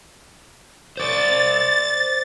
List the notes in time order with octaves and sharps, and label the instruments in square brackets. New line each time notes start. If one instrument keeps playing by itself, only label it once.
[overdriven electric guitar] C5 D5 [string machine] A6